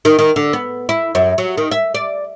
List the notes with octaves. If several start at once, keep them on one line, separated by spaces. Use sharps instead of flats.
D#3
D#3
D3
B3
E4
F#2
F#3
D#3
E5
D5